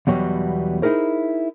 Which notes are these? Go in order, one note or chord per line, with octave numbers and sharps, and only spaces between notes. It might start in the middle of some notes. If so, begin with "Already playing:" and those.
E2 B2 F#3 G3 B3
D#4 E4 G#4 A#4 C5